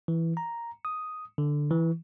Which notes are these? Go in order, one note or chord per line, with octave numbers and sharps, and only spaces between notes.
E3
A#5
D#6
D3
E3